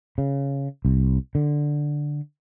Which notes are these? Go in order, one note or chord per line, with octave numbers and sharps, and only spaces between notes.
C#3
C2
D3